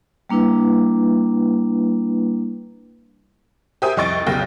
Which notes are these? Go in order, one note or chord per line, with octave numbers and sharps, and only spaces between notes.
G3 A#3 D4 E4 B4
G4 A#4 C5 E5 G#5 D#6
C2 F2 D#5 C#6 A6 D7
F1 B1 C#3 G4 G5 A#6